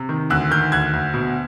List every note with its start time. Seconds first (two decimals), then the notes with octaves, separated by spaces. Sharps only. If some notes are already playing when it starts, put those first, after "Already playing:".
Already playing: C3
0.09 D#3
0.30 D2 E6 F#6
0.51 D#3 F6 G6
0.72 D2 F#6 G#6
0.93 D2
1.14 B2